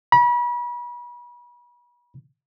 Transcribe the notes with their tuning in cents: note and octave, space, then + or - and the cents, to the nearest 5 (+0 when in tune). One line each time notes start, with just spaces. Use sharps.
B5 -35